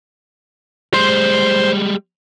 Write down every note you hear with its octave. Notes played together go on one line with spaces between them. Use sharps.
G3 G#3 C5 C6